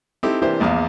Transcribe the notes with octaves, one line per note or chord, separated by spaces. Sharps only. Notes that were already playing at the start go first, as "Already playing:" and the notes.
C4 D#4 E4 G4 A4
C3 E3 A#3 D4 G4 C5
A#1 E2 D5 F5